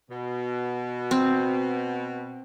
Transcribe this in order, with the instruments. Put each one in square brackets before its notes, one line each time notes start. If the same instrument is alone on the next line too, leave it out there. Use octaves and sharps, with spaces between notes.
[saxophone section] B2
[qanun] C4